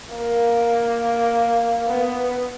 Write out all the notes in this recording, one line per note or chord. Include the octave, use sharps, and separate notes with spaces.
A#3
B3